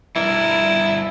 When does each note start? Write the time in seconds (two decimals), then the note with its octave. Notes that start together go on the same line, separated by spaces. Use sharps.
0.16 G2 E4 A#4